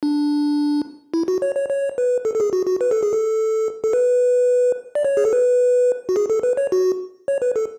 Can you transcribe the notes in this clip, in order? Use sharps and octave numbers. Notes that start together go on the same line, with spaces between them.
D4
E4
F#4
C#5
C#5
C#5
B4
A4
A4
G#4
F#4
F#4
B4
A4
G#4
A4
A4
B4
D5
C#5
G#4
A4
B4
F#4
G#4
A4
B4
C#5
F#4
C#5
B4
A4